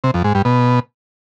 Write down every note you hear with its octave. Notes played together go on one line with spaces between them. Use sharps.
C3
F2
G#2
G2
B2